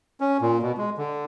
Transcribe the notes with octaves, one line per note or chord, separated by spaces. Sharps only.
C#4
A#2
B2
G#3
D3